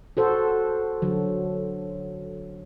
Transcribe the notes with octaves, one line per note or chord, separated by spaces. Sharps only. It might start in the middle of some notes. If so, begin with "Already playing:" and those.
F#4 A4 C5
D3 F#3